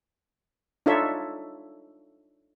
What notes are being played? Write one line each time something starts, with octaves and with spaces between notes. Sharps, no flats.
D4 D#4 F4 A4 C#5 E5